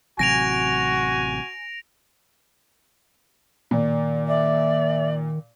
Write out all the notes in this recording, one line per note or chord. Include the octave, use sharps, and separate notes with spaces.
A1 C3 F#3 F#4 G#5 A#6 D7 F7
A#2 D#3 D5
D5 E5